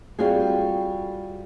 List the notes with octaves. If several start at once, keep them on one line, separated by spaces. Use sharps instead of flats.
G3 C4 F4 F#4 G#4